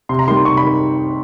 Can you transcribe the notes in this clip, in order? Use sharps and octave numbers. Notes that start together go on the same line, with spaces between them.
C3 C6
A#5
D#3 G3 C6
C3 C#6
B5
D#3